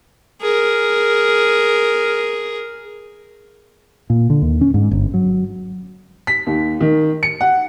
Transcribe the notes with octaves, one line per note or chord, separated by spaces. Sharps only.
G#4 A#4
A#2
D3
D#2
C#4
G#2
G1
F#3
B6
D#2
D#3
C#7
F#5